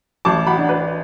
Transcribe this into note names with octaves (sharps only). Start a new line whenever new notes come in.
A1 A5 D6
F#5 B5
D4
B4